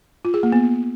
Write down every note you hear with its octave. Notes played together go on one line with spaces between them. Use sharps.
F4
G#4
A#3
B3